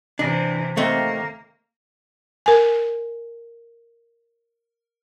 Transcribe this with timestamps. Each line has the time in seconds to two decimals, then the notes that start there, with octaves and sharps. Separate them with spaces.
0.19 C3 E3 D4
0.77 D#2 A3 A#3 C4
2.46 A#4 G#5